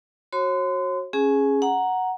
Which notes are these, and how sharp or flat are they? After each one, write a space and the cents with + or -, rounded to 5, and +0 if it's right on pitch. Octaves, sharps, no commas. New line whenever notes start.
F#4 +0 C#5 -40 C6 -35
C#4 -15 G#4 +0 G#5 +20
F#5 +0 A#5 +0